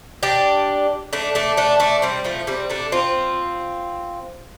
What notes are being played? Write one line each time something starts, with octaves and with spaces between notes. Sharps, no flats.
D4 G4
A3 D4
A3 D4
A3 D4
A3 D4
G3 C4
F3 A3
G3 C4
A3 D4
C4 F4